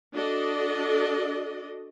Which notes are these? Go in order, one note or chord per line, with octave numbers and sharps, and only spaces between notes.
D4 F#4 A4 D5 D#5